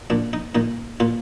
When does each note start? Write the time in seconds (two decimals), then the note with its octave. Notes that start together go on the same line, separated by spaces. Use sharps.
0.10 A#2 D4
0.33 D#4
0.55 A#2 D#4
1.00 A#2 F4